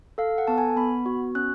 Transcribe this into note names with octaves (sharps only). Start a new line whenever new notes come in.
A4 F5
F#5
B3 A5
G#5
B3 B5
F#4
C#4 F#6